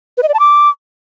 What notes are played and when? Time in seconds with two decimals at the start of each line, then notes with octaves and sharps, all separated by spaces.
0.17 B4
0.23 D#5
0.28 D5
0.34 A5
0.39 D6